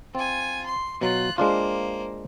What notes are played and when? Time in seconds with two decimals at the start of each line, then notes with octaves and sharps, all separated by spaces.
0.15 C4 F4 G#5
0.66 C6
1.01 B2 F#3 F4 F#6
1.38 G#3 A#3 D4 F4 C5